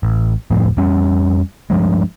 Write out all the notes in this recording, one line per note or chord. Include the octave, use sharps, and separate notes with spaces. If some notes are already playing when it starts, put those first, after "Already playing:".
A1
D1 F2 A2 F3
F2 G3 C#4
G2 F3 G#3